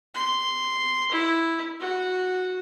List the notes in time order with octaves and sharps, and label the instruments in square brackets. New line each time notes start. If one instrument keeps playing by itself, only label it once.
[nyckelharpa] C6
E4
F#4